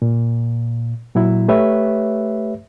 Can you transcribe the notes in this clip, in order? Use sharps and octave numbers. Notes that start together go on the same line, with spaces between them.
A#2
A#2 F#3 E4
A3 G4 B4 C#5 E5